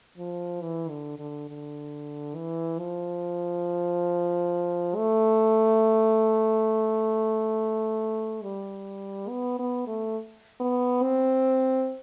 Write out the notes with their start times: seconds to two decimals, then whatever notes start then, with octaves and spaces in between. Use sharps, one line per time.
0.18 F3
0.62 E3
0.90 D3
1.19 D3
1.49 D3
2.35 E3
2.79 F3
4.96 A3
8.43 G3
9.29 B3
9.59 B3
9.87 A3
10.60 B3
11.03 C4